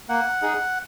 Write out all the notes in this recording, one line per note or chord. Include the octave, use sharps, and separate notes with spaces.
A#3 F#5
D#4 G#4